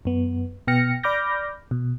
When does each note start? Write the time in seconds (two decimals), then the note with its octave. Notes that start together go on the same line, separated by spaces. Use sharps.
0.05 F#2 B3
0.67 B2 B3 G5 F6 A#6 C#7
1.03 D5 B5 D6 F6 G6 A#6
1.71 B2